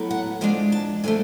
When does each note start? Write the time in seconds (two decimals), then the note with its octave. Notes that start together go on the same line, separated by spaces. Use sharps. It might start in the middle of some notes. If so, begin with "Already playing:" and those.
Already playing: A2 F#3 B3
0.10 F#5
0.41 F3 G#3 D4 G#5
0.72 A5
1.04 D3 F3 A3 G#5